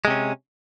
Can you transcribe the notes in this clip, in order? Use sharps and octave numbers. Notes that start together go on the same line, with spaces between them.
C3 G#3 C#4